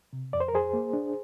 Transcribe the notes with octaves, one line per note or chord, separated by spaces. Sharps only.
C3
F2 D5
C5
A#4
F2 G#4 C5
A#3
D4